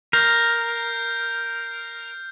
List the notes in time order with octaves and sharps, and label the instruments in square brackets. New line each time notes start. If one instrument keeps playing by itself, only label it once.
[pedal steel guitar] A#4 [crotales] F6 G6 C7